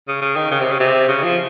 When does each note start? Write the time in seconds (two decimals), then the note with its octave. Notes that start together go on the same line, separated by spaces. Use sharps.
0.08 C#3
0.22 C#3
0.36 D#3
0.51 C#3
0.61 C3
0.71 C#3
0.80 C3
1.09 C#3
1.23 F3